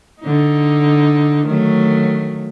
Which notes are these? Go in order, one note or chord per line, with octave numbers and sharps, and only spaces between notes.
D3 D#4
D#3 F#3 A3